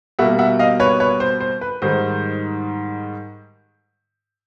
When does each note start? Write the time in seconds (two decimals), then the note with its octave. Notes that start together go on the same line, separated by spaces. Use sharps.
0.19 B2 G3 A#3 E5 F#5
0.39 E5 F#5
0.59 D#5 F5
0.80 B4 C#5
1.00 B4 C#5
1.20 C5
1.40 C5
1.61 B4
1.82 G#2 D#3 G3 C5